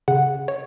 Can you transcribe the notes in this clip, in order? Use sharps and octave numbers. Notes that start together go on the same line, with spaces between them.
C#3 F#5
C#5